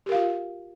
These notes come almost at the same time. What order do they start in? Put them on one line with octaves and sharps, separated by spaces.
G4 A#4 F5 F4